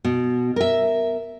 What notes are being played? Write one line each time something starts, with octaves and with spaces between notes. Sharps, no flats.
B2
A#4 E5